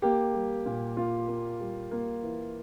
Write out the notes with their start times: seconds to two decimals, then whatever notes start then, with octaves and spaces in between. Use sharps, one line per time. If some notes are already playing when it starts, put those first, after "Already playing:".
0.02 A#3 G4
0.34 G3
0.66 A#2
0.97 A#2 F4
1.28 A#3
1.60 G3
1.91 A#3
2.23 E3